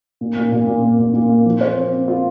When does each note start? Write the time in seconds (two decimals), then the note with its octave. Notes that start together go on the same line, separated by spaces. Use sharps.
0.21 A#2
0.36 A#2
0.52 A#2
0.67 A#2
0.83 A#3
0.99 A#2
1.13 A#2
1.29 A#3
1.46 F3
1.61 C5
1.76 C4
1.92 C4
2.08 F4